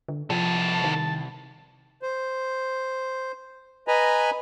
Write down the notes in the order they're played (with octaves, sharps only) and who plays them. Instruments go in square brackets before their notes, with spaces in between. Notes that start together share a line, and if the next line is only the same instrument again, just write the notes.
[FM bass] D3
[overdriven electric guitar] C2 [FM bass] F3 [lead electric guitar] B3 A4 [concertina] A5
[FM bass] D#3
[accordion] C5
B4 D#5 G#5 A#5 B5